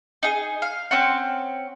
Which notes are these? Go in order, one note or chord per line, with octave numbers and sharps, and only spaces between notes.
D#4 G#4
F5
C4 C#4 F#5